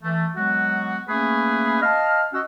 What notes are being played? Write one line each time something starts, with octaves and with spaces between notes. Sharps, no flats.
E3 A3
F#3 G#3 B3 F#4
A3 A#3 C#4 G#4 B4
D#5 F5 A5 F6
C#4 F#4 D#5 F#5 E6